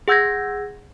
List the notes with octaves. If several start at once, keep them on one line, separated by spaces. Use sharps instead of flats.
G#4 F#5 E6 G6 G#6 A#6